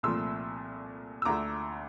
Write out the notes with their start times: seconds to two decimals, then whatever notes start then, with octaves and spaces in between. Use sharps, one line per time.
0.03 C2 A#2 F3 A3 C6 E6
1.22 E6
1.25 D2 D3 A3 A#5 D6